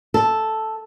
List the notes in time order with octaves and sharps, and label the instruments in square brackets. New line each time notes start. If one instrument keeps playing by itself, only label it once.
[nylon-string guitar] A4